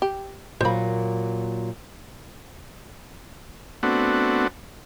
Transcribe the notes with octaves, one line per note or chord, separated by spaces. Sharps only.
G4
A#2 F#3 A#3 C5 B5
A3 B3 C4 D4 F#4